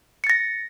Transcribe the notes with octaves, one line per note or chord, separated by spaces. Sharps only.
A6 A#6 C#7